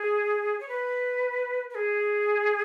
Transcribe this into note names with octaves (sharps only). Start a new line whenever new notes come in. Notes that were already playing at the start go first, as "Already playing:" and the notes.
Already playing: G#4
C#5
B4
B4
G#4